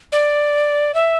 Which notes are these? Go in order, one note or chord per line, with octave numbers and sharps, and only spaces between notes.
D5
E5